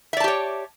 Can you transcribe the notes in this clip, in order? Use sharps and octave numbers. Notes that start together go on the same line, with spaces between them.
G4 C#5 D5 E5 A5